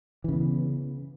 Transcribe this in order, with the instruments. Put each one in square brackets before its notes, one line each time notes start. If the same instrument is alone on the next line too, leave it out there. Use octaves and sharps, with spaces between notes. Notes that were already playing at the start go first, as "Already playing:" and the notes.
[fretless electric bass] E3
C#3
B3